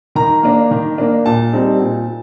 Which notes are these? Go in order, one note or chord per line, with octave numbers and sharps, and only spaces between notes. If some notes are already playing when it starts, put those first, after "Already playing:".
D#3 A#5
A#3 D4
D#3
A#3 D4
A#2 A5
G3 C4 D#4
A#2